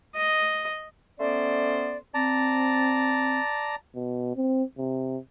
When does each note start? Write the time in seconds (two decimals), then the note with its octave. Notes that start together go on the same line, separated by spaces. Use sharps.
0.15 D#5
1.19 A3 B3 C#4 C5 D5
2.14 C4 D5 A5 A#5
3.95 B2
4.36 C4
4.78 C3